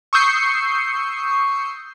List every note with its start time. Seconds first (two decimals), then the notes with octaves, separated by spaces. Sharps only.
0.13 C#6 D#6 E6 G6 C7 C#7